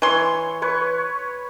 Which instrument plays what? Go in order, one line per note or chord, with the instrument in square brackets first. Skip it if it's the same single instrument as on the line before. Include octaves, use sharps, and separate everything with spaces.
[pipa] E3 C6 [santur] C#5
[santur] B4 C#5 C#6